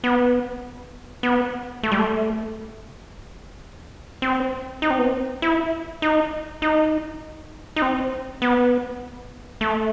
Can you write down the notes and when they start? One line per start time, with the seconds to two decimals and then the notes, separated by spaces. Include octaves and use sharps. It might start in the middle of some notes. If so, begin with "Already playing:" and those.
0.04 B3
1.23 B3
1.83 A3
1.92 G3
1.99 A3
4.22 C4
4.82 D#4
4.90 C4
4.99 B3
5.07 C4
5.42 E4
6.02 D#4
6.62 D#4
7.76 D#4
7.82 C4
8.42 B3
9.61 A3